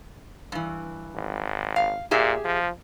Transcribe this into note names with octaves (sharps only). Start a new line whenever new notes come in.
G2 E3
G#1
F5
A#2 G4 G#4 E5
F3